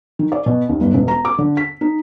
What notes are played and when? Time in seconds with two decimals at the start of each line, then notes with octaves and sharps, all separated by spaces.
0.19 D#3
0.32 D5
0.46 B2
0.69 D#2
0.81 G1
0.94 E1
1.08 A#5
1.25 D6
1.38 D3
1.57 B6
1.81 D#4